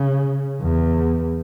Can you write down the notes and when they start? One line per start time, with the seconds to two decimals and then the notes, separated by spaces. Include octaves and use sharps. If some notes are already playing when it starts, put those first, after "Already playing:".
Already playing: C#3
0.61 E2